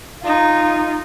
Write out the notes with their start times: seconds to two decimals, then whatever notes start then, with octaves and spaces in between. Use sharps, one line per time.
0.22 D#4 F4